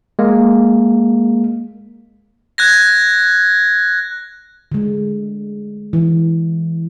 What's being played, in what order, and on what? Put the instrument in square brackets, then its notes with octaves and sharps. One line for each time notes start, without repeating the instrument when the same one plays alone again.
[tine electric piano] G#3 A#3
[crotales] F#6 G#6 A#6
[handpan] D3 G#3
E3